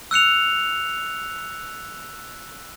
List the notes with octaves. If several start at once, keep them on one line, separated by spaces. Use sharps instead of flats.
E6 F#6 C#7 F7